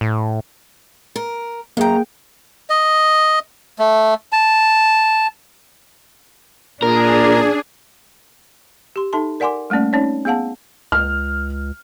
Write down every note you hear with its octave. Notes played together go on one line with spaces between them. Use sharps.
A2
A#4
F#2 A#3 G#4 G5 A#5
D#5
A3
A5
A#2 D4 G#4 A#4
G4 C6
D#4 A4 E5 A5 C6
A#4 D5 F#5 G#5 C6 D6
G3 A3 A#3 C#4 D5
C4 C#4 D#4 C#5 D5
B3 G#4 F5 F#5 A5
C#2 F6